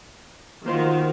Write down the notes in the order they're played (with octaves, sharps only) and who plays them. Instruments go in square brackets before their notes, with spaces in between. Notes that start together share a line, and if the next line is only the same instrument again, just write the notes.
[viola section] D#3 [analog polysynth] A#3 C5 C6 [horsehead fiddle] F4 F#4